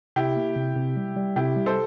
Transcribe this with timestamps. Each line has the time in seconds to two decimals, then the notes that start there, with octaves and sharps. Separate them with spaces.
0.16 C3 E4 G4
0.37 A#3
0.56 C3
0.76 C3
0.97 G3
1.16 G3
1.36 C3 E4 G4
1.56 G3
1.66 A4 C5